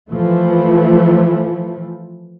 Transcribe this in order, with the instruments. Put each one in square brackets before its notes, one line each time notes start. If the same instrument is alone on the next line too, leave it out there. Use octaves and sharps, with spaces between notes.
[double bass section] E3 F3 A3